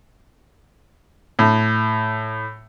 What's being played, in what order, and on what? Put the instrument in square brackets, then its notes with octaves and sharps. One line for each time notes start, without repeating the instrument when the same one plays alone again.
[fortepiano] A2